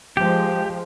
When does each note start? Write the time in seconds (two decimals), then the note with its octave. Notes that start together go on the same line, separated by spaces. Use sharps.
0.17 F3 G#3 G4